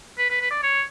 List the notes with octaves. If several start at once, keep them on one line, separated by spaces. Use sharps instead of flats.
B4
B4
B4
D5
C#5